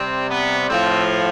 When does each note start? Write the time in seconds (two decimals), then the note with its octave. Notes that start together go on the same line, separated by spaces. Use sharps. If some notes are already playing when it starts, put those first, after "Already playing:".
Already playing: C3 G3 C4
0.30 B3
0.69 A2 F3 C4